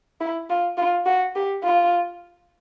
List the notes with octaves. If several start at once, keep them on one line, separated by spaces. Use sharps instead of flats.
E4
F4
F4
F#4
G4
F4